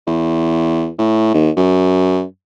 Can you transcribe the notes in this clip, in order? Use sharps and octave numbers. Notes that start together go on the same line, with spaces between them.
E2
A2
D#2
F#2